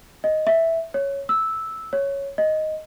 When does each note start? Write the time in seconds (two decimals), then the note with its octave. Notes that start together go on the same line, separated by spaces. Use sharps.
0.24 D#5
0.47 E5
0.94 C#5
1.29 E6
1.93 C#5
2.38 D#5